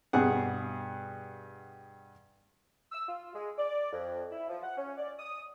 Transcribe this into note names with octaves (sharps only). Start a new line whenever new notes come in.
G2 B2 G#4 F#5
E6
F4
G#3
D5
F2
E4
F3
F#5
C#4
D5
D#6